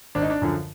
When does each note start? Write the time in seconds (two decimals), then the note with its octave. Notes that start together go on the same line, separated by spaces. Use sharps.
0.15 G#1 D4
0.22 D#4
0.30 D4
0.42 F#2 D3 F3